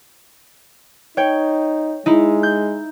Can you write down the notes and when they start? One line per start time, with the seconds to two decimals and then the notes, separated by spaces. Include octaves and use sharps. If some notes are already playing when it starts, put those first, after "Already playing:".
1.17 D#4 C#5 G5
2.06 G#3 D#4 E4
2.43 G6